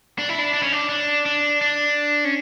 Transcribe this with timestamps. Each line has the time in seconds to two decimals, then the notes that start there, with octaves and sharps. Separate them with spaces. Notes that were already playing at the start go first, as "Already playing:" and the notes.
0.19 D4
0.29 E4
0.39 D4
0.54 D4
0.63 C#4
0.72 D4
0.89 D4
1.26 D4
1.61 D4
2.25 C#4